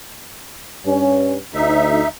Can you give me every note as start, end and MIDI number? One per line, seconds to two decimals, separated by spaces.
0.86 1.34 43
0.86 1.34 61
1.54 2.01 38
1.54 2.08 63
1.54 2.08 76